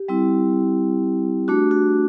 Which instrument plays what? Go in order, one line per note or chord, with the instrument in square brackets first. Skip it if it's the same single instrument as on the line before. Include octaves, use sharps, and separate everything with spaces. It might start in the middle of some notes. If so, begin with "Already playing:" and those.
Already playing: [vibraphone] G4
G3 C4 E4
A3 D4 F#4
F#4